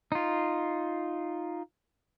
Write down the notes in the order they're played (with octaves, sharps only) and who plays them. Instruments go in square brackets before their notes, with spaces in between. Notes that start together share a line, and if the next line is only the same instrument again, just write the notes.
[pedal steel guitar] D#4 F4